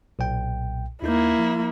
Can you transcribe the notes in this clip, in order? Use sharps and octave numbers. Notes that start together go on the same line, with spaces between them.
B1 A#2 G5
D#2 A#3 D#4 E4 G6
F3